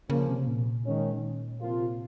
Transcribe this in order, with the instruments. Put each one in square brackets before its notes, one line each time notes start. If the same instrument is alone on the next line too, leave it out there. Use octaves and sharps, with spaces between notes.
[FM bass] C#3 [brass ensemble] F3 A#3 C#4
[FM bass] C3
A#2
[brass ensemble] D#3 G#3 C#4
C3 F3 A#3 F4